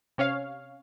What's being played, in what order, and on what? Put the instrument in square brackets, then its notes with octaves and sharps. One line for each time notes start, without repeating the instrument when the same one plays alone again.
[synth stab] C3 C#4 C#5 F5